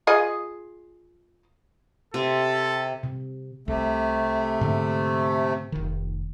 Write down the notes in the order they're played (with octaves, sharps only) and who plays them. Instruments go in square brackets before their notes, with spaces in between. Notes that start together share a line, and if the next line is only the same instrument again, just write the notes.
[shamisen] F4 G#4 D#5
[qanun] C3 [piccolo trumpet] A4
[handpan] C3
[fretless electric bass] C2 [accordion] C3 A3
[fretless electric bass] G#2 D3 A#3
F1 D#3